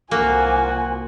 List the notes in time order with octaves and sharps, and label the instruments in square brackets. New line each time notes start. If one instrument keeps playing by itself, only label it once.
[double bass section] C2 F3 [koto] A#3 [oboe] F#4 [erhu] G#5